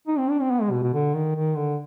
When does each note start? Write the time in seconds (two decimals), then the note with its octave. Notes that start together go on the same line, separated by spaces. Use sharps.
0.07 D#4
0.18 C4
0.30 D4
0.41 C4
0.51 B3
0.61 G#3
0.71 B2
0.83 B2
0.94 D3
1.14 D#3
1.36 D#3
1.57 D3